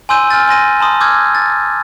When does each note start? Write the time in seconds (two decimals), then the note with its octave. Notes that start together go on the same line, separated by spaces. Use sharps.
0.09 G#5 C6 E6 G6 D#7
0.30 G#5 F6 G6 A6
0.48 G#5 C6 A#6 D#7
0.80 A5 A#5 C6 D#6
1.01 D6 E6 F6 G6 G#6
1.35 A6